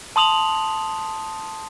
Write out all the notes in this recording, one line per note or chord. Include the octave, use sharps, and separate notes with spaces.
A5 C6 D#6 F7 F#7